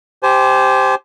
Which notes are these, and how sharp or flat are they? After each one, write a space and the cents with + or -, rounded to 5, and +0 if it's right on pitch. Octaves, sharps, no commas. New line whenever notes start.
G4 +0 C5 -5 G#5 +35